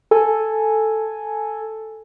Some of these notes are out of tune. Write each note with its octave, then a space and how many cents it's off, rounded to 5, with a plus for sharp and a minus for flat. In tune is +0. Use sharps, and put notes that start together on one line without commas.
A4 +0 G#5 +0